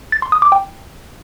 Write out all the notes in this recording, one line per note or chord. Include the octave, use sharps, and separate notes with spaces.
A6
C6
D#6
D6
G5